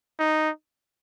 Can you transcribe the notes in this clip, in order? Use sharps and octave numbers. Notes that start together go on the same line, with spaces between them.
D#4